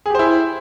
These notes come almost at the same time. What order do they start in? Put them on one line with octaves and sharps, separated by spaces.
G#4 G4 C5 E4